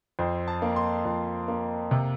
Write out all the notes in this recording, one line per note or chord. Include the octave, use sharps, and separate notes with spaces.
F2 C5
A5
A#3
C6
F2
A#3
C3